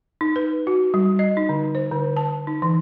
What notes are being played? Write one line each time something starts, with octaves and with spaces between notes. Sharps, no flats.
D#4
B4
F#4
G3
D#5
D#4
D3
C5
D3
A5
D#4
E3